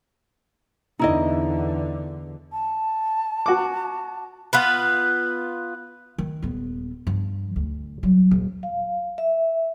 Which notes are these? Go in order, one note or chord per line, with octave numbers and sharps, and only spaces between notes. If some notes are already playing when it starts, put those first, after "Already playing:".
E2 D3 D#4 E4 D#5
A5
F#4 D6
B3 F4 B4
D#3
D#1 B3
G2 F3
D2
F#3 G3
D#1
F5
E5